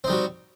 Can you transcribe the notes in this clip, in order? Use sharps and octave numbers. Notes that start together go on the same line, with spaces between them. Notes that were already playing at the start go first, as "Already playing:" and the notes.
G3 C4 D#4 F#4